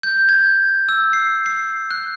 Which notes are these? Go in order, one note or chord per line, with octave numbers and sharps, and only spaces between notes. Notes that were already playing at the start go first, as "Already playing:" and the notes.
G6
G#6
E6
C7
C7
F#6